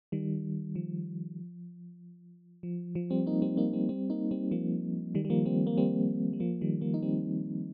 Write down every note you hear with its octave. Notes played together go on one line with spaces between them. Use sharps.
D#3 G3
F3
F3
F3
G3 C4
A#3 D#4
G3 C4
A#3 D#4
G3 C4
G3 C4
A#3 D#4
G3 C4
F3 A#3
D#3 G3
G3
F3 A#3
G3 C4
A#3
G3 C4
G3
F3 A#3
D#3 G3
F3 A#3
D#4
G3 C4